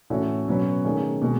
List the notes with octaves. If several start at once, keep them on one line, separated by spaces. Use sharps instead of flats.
A2 E3 A3 C#4 F#4
B2 F#3 C#4 F#4 B4
D#3 A3 C#4 G#4
B2 G#3